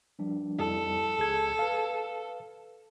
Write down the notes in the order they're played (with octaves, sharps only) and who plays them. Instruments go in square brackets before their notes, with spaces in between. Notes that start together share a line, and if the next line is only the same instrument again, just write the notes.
[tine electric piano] F3 G3 D4
[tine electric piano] F2 G3 E4 [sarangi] A4
[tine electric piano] C#2 G#4 G#6
B4 F5